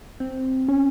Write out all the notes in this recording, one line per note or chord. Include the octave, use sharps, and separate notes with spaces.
C4
C#4